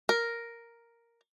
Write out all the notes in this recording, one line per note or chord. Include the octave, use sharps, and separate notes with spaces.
A#4